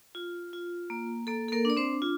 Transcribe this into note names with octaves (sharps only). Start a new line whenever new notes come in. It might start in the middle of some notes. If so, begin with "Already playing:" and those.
F4
F4
A#3
A#3 A4
A4
A#3 A#4
D4 D5
C4 C5
F4